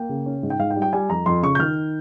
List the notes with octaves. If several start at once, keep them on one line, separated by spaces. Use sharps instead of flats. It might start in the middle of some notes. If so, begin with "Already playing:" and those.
Already playing: A#3 G5
C#3
C#4
G#2
G5
G#2 F5
G5
G3
G5
G3 G#5
F2 A#5
F2 C6
C#3 C#6
G6
D#3 F6